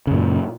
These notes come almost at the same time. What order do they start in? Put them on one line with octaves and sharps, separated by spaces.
C#3 F#2 A#2